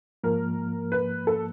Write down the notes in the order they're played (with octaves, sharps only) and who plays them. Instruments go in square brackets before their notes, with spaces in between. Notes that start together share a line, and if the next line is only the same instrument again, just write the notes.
[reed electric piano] G#2 F3 A#3 [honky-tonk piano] A#4
[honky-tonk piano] B4
A4